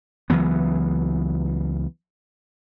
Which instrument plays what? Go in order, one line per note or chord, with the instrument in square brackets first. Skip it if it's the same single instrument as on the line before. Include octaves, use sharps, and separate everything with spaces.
[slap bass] C#2 E3 F#3 B3